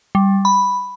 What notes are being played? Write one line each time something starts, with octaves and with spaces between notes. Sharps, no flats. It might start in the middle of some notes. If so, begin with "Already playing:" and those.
G3
B5